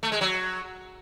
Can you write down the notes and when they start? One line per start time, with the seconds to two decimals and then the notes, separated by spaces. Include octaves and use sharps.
0.03 A3
0.12 G#3
0.21 F#3